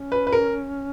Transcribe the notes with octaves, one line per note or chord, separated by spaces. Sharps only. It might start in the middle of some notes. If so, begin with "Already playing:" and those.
Already playing: C#4
B4
B4
A#4